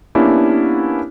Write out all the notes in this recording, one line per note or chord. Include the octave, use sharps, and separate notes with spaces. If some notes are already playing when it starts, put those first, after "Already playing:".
A#3 B3 C#4 D4 E4 G4